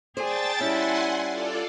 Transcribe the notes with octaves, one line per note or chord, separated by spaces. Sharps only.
G#4 C5 D5 G5 A5 A6
G3 C#4 E4 F#5 G#5 C6
F4 A4 D5